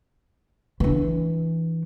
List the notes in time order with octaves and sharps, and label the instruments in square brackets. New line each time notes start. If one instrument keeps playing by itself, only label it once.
[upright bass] E3 D4